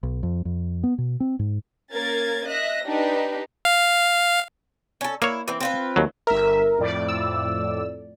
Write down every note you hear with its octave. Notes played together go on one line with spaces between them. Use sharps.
B1
F2
F2
B3
B2
C4
G#2
A#3 C#4 A#4 G#6 A6
D#5 E5 F#6 A#6
D4 D#4 G4 B4
F5
C#4 A4
A#3 E4 C#5
E3 C4
C4 F4 B4
D#2 F#3
G1 A#4 E5
F2 A2 D5
E6